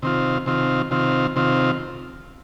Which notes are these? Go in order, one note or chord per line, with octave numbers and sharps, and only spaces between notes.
C3 D#3 C4 F4
C3 D#3 C4 F4
C3 D#3 C4 F4
C3 D#3 C4 F4